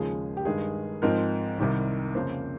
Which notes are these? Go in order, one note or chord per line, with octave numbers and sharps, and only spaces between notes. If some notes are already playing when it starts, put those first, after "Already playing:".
Already playing: D#2 C#3 F3 G#3 G#4
G4
G2 D#3 G#3 G#4
G#2 F3 C4 D#4 A#4
C2 C3 D#3 G3
F2 C#3 F3 A#3 C5